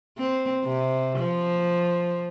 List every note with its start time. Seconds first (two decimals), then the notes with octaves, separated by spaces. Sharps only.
0.18 C4
0.64 C3
1.18 F3